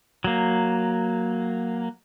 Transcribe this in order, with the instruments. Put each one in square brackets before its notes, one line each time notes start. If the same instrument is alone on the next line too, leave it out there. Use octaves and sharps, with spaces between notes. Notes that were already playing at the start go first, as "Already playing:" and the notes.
[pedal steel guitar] F#3 A#3